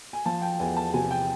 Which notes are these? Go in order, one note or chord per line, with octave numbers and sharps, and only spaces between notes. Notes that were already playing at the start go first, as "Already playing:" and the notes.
G#5
F3 A5
G5
E2 G#5
A5
C3 G#5
G5